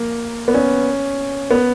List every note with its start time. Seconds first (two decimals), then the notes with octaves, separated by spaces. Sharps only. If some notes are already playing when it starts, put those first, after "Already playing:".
Already playing: A#3
0.48 B3
0.54 C#4
1.51 B3